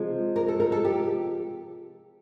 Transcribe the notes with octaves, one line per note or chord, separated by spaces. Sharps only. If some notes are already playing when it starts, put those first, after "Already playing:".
Already playing: C3 F3 G#3
A#4
A4
A#4
A4
G4